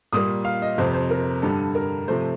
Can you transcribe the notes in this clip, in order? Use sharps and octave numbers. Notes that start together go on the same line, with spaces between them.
A#2 G3 A#3 D#6
F5
D#5
F2 C3 F3 C5
C5
A#4
G2 D3 G3 A4
A#4
C3 F3 A3 C5